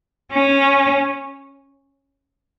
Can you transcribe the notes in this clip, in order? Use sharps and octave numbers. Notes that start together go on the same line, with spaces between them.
C#4